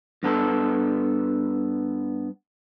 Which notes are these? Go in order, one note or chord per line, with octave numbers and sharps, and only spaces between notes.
G2 B3 A4